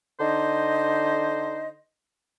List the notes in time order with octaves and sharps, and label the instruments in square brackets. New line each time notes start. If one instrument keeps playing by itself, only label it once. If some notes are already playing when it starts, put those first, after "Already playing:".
[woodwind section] D3 D#4 C5 D#5